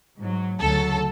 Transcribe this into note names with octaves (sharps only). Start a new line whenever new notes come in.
G#2 F#3
D2 C#3 F#3 A4